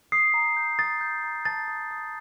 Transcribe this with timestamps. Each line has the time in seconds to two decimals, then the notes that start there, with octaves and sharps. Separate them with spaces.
0.12 D#6 C7
0.34 A#5
0.57 G6
0.79 D#6 A6
1.01 G6
1.24 A#5
1.45 A5 A6
1.68 D#6
1.91 D#6